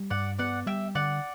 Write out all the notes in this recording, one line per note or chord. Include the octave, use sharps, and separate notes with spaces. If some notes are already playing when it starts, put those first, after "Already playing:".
Already playing: G3
G2 D5 F#5
B3 D5 F#5
G3 E5 G5
D3 D5 F#5